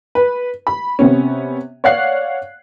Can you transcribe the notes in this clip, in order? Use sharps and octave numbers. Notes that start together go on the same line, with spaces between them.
B4
B5
C3 B3 C#4
C#5 D5 F5 F#5 F#6 C7